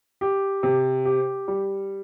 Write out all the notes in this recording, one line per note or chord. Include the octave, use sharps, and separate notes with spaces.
G4
C3
G4
G3